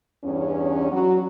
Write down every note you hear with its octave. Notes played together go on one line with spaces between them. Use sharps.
E2 G2 C#4
F#3 F#4